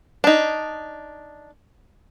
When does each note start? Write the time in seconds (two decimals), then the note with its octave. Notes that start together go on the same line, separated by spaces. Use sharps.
0.24 D4 D#4